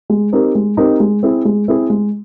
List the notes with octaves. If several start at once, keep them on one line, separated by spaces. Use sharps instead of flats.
G#3
C4 D#4 G4 A#4
G#3
C4 D#4 G4 A#4
G#3
C4 E4 G#4
G#3
C4 E4 G#4
G#3